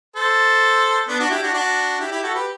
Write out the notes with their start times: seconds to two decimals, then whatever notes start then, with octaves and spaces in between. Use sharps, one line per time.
0.16 A4 C5
1.08 B3 D4
1.20 D4 F#4
1.31 E4 G4
1.43 D4 F#4
1.54 D4 F#4
2.00 E4 G4
2.11 E4 G4
2.23 F#4 A4
2.34 G4 B4